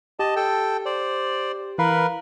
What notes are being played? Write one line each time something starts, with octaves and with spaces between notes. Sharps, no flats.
G4 D#5 A5
A4 G5
C5 D5
E3 A#4 B4 F5 B5